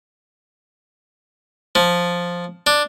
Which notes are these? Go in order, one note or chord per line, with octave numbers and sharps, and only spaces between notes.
F3
D4